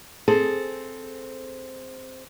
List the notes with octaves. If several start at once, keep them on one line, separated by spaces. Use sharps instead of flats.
C4 G#4 A4 C5